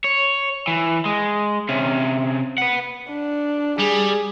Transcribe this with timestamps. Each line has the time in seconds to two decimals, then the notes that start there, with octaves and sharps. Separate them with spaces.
0.04 C#5
0.67 E3
1.05 G#3
1.69 C3 C#4
2.58 B4 F#5
3.09 D4
3.80 G3 G#4